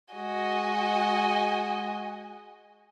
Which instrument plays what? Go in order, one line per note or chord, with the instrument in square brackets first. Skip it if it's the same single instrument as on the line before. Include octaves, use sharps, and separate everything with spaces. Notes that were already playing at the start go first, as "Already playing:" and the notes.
[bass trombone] G#3 [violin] F#4 D#5 [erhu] G#5